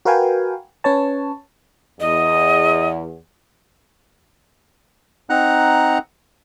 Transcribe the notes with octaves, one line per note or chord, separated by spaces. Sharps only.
F#4 A#4 B4 F5 G5 G#5
C#4 B4 C#5 A5
E2 D#5
C4 D#4 F#5 A#5 F#6